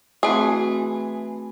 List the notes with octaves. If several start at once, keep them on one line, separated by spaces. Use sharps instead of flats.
E3 A3 C4 F#4 G#4